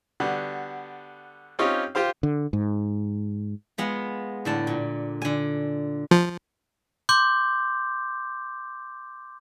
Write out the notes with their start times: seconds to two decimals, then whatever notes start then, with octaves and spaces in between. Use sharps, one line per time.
0.20 D3 G3 B3 F#4
1.59 C4 C#4 D#4 F4 G4 C#5
1.95 F4 G4 C5 F5
2.23 D3
2.53 G#2
3.78 G#3 B3 F4
4.45 A2 D3 A5
4.67 A#2
5.22 D3 G#5
6.11 F3
7.09 C6 D6 G6